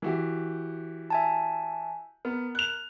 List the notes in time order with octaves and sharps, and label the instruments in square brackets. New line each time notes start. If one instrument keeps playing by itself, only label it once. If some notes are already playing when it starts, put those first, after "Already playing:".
[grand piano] E3 F#4 G4
[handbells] E5 G#5 A5
[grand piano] B3 [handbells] A#4
[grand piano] F#6 F7